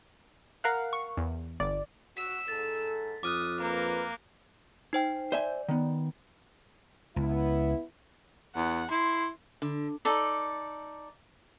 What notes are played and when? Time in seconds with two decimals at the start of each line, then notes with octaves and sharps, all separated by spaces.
0.64 A#4 F5 F#5
0.93 C#6
1.17 E2
1.60 G1 D5
2.17 F#4 E6 B6
2.48 G#2 A4 A6
3.23 F2 D6 D#6 F6 F#6
3.60 A#3 B4 A#5
4.93 D#4 C5 G5
5.32 C5 D5 E5 G#5
5.69 D#3 B3
7.16 C#2 B3 E4
8.56 E2 F#5
8.91 E4 C6
9.62 D3
10.05 D#4 A4 D5